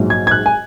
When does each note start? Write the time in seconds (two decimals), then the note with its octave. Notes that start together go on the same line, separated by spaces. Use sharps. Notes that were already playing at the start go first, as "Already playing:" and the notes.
Already playing: A#1 G#2 F#3
0.10 G#6
0.27 G#6
0.31 F#6
0.46 G#5